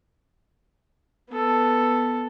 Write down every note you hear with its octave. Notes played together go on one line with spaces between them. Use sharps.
B3 A4